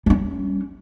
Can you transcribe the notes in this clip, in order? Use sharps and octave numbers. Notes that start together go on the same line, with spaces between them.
G3 C#4